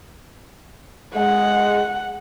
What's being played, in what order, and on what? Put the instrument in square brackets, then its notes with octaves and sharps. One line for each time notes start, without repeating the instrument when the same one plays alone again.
[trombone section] G#3 [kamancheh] F#5